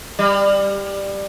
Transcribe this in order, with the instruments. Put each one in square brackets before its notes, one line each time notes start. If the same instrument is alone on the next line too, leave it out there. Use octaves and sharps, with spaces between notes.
[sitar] G3